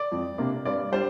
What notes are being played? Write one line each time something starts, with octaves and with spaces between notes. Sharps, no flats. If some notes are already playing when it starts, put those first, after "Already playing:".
Already playing: D5
F2
C3 A#3 D4
G2 D5
G3 D4 C5